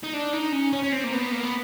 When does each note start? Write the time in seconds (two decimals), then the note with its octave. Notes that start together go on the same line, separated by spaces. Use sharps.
0.04 D#4
0.14 D4
0.34 D#4
0.53 C#4
0.73 C#4
0.83 C#4
0.92 C4
1.04 A#3
1.12 B3
1.31 A#3
1.43 B3